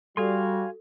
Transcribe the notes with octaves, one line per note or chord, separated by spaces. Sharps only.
G3 F#4 A4 F5 G#5 C6